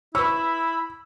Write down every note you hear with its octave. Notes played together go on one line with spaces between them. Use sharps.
E4 B4 C#5 B5 E6